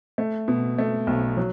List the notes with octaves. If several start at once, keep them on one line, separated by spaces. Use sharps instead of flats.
A3
B2
A3
B1
F#3